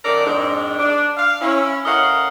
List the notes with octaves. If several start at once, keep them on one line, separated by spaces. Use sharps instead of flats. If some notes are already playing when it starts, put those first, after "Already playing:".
F#2 D#3 A4 A#4 D5
F2 G#2 D4
D4
F5
C#4 E4
A2 C#4 A#4 D#5 F5 F#5